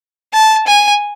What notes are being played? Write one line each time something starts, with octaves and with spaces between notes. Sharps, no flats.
A5
G#5